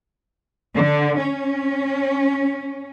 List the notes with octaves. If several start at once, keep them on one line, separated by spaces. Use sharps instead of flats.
D3
C#4